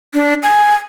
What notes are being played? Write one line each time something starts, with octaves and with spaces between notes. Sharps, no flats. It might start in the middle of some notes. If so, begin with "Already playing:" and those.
D4
G#5